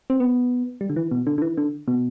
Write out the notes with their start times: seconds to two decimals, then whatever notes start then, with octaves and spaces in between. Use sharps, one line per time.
0.10 C4
0.20 B3
0.81 G3
0.90 D3
0.96 E3
1.11 B2
1.27 D3
1.38 D3
1.42 E3
1.57 D3
1.88 B2